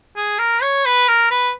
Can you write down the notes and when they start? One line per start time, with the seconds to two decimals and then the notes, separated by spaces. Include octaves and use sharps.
0.16 G#4
0.39 A#4
0.62 C#5
0.85 B4
1.08 A#4
1.31 B4